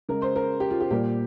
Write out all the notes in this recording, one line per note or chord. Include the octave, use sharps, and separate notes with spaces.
C#3 G#3 A#4
C5
A#4
G4
F4
G4
A#2 G3 A#3 G4